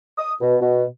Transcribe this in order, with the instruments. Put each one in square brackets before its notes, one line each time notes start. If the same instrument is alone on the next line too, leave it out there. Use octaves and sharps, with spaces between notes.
[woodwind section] D#6
B2
B2